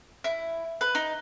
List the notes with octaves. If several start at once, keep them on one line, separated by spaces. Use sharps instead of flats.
E4
B4
D#4